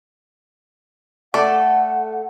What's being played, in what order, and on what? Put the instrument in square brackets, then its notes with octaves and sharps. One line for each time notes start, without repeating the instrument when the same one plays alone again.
[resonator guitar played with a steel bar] A3 A4 [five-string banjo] D5 [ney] F#5